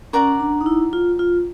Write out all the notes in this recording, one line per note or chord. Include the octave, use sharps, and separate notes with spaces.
C#4 A#4 D5 F#5 A#5
D4
D#4
E4
F4
F4